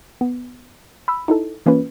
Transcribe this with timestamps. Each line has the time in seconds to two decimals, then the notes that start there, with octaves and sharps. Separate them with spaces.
0.21 B3
1.08 B5 E6
1.28 D#4 E4 A4
1.66 E3 A#3 C#4 F4 B4